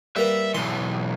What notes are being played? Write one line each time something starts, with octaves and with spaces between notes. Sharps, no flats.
G3 A#3 B4 E5
B1 E3 C6